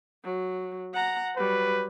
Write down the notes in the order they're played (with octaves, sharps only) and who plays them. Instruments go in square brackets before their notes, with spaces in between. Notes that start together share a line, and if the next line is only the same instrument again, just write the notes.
[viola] F#3
F#5 A#5
[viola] F#3 G3 [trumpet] B4